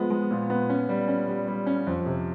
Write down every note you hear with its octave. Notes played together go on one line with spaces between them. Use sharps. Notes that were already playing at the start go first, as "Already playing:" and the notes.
Already playing: F3 G#3 B3
G#3
A#2
B3
C#4
G3
C#4
G3
G3
C#4
F2
C3